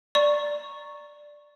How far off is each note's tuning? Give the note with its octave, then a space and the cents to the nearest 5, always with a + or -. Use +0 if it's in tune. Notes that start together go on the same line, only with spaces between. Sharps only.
D5 +0 A#5 +0 C#6 -5